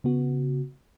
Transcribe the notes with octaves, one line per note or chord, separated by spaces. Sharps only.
C#3 B3 F#4